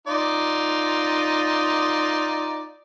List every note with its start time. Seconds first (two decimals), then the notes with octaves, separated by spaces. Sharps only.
0.07 D#4 F4 D5